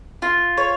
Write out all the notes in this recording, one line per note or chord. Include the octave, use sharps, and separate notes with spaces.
F4
C#5